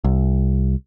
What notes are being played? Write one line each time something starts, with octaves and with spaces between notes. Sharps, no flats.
C2